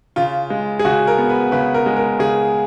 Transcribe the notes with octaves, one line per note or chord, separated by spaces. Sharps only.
C#3 F4
G#3
G#4
C#3 F#4
A#4
B3
B4
C#3 B4
A#4
G#3
A#4
C#3 G#4